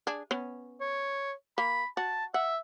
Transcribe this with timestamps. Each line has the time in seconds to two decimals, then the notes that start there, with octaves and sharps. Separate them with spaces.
0.07 D4 G#4
0.31 B3 C#4
0.80 C#5
1.58 A#3 B5
1.97 F#4 A5
2.34 E5 F#5